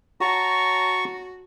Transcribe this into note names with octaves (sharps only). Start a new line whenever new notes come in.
F#4 C#5 A5 A#5 C#6